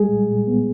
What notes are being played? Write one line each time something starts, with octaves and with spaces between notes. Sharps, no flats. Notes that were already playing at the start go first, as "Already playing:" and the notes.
Already playing: C2 G3 G#3 G#4
A#2
A#2
B3